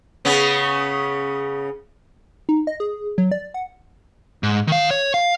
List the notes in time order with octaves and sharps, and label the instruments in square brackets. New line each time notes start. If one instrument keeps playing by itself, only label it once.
[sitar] C#3 B3 C#4
[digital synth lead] D#4
D#5
G#4
F#3
D5
F#5
[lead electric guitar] G#2
D#3 F5
C#5
F5